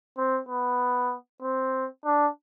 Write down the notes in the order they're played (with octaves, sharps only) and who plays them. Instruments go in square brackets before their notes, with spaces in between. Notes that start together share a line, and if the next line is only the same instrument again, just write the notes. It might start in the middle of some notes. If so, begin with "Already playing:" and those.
[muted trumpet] C4
B3
C4
D4